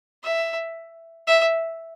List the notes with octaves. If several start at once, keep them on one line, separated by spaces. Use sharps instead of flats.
E5
E5